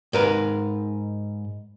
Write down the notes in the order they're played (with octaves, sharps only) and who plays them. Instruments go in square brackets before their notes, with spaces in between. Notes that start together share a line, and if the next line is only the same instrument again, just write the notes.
[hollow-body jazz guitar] G#2 A#4 B4